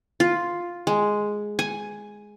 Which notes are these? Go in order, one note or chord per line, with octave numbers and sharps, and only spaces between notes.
F4
G#3
G#5